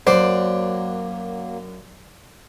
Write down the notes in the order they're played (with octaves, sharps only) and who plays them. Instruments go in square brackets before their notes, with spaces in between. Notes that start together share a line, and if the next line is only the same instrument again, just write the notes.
[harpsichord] F#2 F#5 [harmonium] F#3 A#3 [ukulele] C5 [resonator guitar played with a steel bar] D5